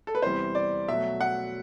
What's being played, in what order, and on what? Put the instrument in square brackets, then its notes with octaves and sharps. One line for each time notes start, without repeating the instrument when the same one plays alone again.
[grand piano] A4
B4
E2 C3 E3 G3 C5
D5
B2 F#3 A3 E5
F#5